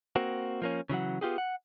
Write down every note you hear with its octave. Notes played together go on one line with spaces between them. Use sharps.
A#3 C4 F#4
F3 A#3 C#4
C#3 E3 F#3 F#5
B3 F4 G4 G#4
F#5